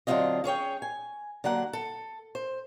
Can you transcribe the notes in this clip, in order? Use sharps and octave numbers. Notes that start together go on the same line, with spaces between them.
D3 F#3 C4 D#4 F4 D#5
C#4 G#4 C#5 G5
G#5
D3 F#3 A#3 F#5
A4
C5